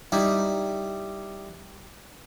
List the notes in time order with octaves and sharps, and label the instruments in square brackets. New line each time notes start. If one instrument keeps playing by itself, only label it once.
[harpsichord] G3 D#4 E4